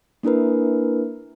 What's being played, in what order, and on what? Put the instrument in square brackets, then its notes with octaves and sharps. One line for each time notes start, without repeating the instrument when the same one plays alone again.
[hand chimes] A#3 D4 E4 A#4 B4